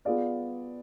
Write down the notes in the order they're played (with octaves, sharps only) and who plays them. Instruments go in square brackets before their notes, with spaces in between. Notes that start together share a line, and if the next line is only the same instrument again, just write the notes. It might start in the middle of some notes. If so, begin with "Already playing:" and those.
[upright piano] B3 F4 G#4 D5 F5